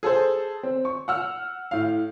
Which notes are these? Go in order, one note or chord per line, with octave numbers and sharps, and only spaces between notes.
G#4 A4 C5
C4
C#6
F#5 E6 F6
A2 F5